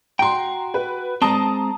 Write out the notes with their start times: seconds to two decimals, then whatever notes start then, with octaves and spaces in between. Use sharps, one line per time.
0.19 F#4 G5 A#5 C6
0.74 B4
1.22 G#3 C4 A5 A#5 D#6